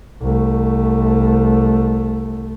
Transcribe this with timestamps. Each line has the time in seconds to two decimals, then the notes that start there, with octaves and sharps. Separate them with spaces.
0.22 C2 A3